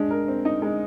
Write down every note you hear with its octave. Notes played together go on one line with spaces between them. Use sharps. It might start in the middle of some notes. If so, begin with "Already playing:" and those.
Already playing: G#3 D4
A#4
C4
D#4
G#3